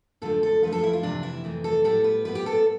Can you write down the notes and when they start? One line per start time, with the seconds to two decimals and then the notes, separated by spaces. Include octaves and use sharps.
0.22 F2 D3 F3 A3 A4
0.43 A4
0.63 F2 D3 F3 A3 B4
0.72 A4
0.84 E4
0.93 F4
1.03 F2 C3 E3 A3 D4
1.23 E4
1.44 F2 C3 E3 A3
1.64 A4
1.84 A2 G3 B3 A4
2.04 B4
2.25 A2 G3 B3 B4
2.35 G4
2.46 A4